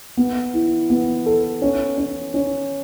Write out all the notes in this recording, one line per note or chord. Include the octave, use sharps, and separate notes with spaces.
B3
E4
B3
A4
C#4
C#4
C#4